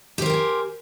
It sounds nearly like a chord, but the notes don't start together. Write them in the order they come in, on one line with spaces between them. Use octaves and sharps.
G4 C5 A#4 G5 G#5